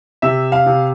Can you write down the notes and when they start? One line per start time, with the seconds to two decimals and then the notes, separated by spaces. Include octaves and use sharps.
0.22 C3 E5
0.52 F5
0.67 C3